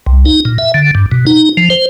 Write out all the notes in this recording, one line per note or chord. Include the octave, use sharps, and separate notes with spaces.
C2
D#4
A#2
E5
D3
G2
B2
D#4
F3
C5